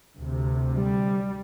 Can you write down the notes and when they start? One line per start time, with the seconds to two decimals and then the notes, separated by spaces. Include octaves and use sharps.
0.20 D2 C3
0.77 G3